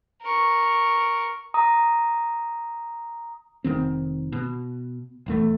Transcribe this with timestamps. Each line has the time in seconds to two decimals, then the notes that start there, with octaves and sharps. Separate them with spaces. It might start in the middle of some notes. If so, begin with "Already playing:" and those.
0.23 A#4 C#6
1.54 A#5 D#6
3.64 F1 C2 D#3 C4
4.32 B2
5.26 D#1 E2 A3